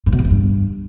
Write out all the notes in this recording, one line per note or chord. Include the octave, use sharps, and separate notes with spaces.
G#2
B2
E2
F2
G2